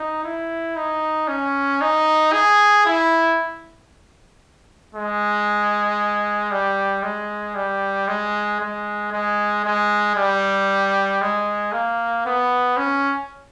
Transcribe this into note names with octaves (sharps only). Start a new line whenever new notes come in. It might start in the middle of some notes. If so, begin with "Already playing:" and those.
Already playing: D#4
E4
D#4
C#4
D#4
G#4
E4
G#3
G3
G#3
G3
G#3
G#3
G#3
G#3
G3
G#3
A#3
B3
C#4